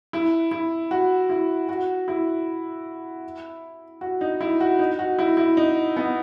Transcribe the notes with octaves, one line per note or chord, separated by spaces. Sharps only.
E4
E4
F#4
E4
F#4
E4
F#4
D#4
E4
F#4
D#4
F#4
E4
E4
D#4
B3